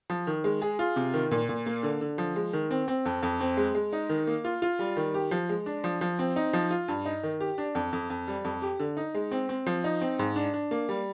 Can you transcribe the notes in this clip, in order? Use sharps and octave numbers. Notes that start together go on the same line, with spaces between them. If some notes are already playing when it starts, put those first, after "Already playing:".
F3
D#3
G#3
G#4
F4
C3
D#3
A#2
A#2
A#3
D3
D3
F3
G#3
D#3
C4
C4
F2
F2
C4
G#3
G#3
D#4
D#3
A#3
F4
F4
G3
D#3
G4
F3
G#3
D4
F3
F3
C4
D#4
F3
F4
G2
D#4
D#3
G4
D4
F2
F2
F2
G3
F2
G4
D3
D#4
G#3
C4
C4
F3
D#4
C4
G#2
D4
D4
A#3
G3